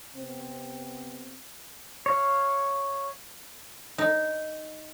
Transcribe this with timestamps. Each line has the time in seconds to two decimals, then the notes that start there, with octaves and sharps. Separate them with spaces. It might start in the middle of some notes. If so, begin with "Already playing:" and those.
0.15 C3 B3 C4
2.06 C#5 F5
3.98 D#4